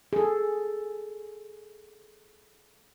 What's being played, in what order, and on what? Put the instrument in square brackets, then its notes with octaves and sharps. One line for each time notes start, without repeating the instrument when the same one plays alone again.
[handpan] G#4 A4